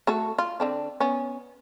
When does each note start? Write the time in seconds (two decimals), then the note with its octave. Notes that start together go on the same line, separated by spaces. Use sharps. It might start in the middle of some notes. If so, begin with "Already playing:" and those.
0.07 A3 F#4 A4
0.38 F4
0.60 D3 C4 D4
1.00 B3 C#4